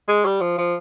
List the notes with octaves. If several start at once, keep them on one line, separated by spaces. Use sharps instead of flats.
G#3
G3
F3
F3